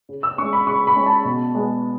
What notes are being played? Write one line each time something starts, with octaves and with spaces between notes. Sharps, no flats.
C#3
E6
G#3 C#4 C#6
B5
C#3 C#6
B5
G#3 C#4
A5
B2
G#3 B3